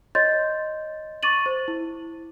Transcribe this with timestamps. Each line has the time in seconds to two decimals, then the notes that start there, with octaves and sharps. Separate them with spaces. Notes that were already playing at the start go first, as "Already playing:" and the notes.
0.15 C#5 D#5 C6 G6 A6
1.23 C#6 D6 A6 D#7 F#7
1.46 C5
1.68 E4